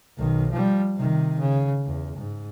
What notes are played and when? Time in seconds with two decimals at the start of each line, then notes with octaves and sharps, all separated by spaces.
0.17 B1 D#3
0.52 F3 G3
0.96 C3 D#3
1.40 C#3
1.86 E2
2.16 G#2